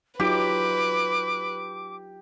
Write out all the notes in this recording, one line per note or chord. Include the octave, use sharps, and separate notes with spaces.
F#3 D#4 F4 G4 B4 D6